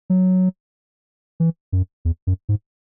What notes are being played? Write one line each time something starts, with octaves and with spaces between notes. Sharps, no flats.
F#3
E3
F#2
E2
F#2
G#2